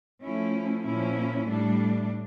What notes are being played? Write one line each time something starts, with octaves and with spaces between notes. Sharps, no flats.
F3 A3 C#4 E4
A#2 F3 C#4 E4
A2 G3 D4